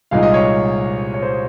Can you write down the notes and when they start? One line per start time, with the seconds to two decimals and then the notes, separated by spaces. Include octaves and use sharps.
0.11 C2 A#2 G#3 D#4 F5
0.23 D#5
0.34 C#5 F5
1.14 C#5
1.22 C5